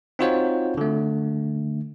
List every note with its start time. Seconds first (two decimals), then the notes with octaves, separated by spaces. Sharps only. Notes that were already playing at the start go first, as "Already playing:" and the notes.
0.19 C4 D#4 F4 F#4 C5 C#5
0.77 D3 A3